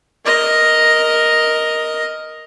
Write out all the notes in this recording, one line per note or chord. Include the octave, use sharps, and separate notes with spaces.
A#4 D#5